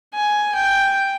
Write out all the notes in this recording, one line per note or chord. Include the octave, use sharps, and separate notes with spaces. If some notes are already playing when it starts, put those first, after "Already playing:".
G#5
G5